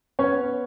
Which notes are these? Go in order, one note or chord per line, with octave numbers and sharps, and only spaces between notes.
B3 C#4 C#5